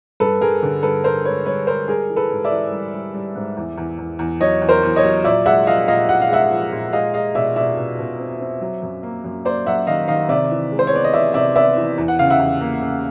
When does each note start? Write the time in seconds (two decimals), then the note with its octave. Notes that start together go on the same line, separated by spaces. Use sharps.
0.20 G2 A4 B4
0.41 G2 G#4 A#4
0.62 D3
0.83 G2 A4 B4
1.04 G2 A#4 C5
1.25 G#3 B4 C#5
1.46 G2 B4 C#5
1.67 G#3 A#4 C5
1.88 G3 G#4 A#4
2.10 E3
2.16 A4 B4
2.31 G#2
2.45 D5 E5
2.52 E3
2.72 G3
2.94 G3
3.14 G3
3.35 G#2
3.57 E2
3.78 E2
3.98 E2
4.19 E2
4.41 F#3 C#5 D#5
4.62 E2
4.69 A#4 C5
4.83 E2
4.96 C#5 D#5
5.03 F#3
5.24 A#2 D5 E5
5.46 G#3 E5 F#5
5.67 F3 D#5 F5
5.88 A#2 D#5 F5
6.09 A#2 F#5
6.22 F5
6.29 G#3 E5 F#5
6.51 F3
6.72 A#2
6.93 G#3 D#5 F5
7.14 G#3 D#5 F5
7.35 B2 D5 E5
7.56 B2 D5 E5
7.77 B2
7.99 B2
8.19 C4
8.40 C4
8.61 F#3
8.82 F#2
9.03 A#3
9.24 F#2
9.45 A#3 C5 D5
9.66 F#2 E5 F#5
9.87 D#3 D#5 F5
10.08 D#3 D#5 F5
10.29 C3 D5 E5
10.51 E3
10.72 G#3
10.79 C5
10.87 C#5
10.93 B3 D5
11.04 D#5
11.13 E3 D5 E5
11.34 C3 D5 E5
11.55 B3 D5 E5
11.77 E3
11.98 E2
12.08 F#5
12.19 C#3 F5
12.30 E5 F#5
12.39 E2
12.61 A#3
12.81 C#3